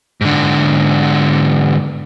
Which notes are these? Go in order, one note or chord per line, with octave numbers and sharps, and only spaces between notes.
G#2 D3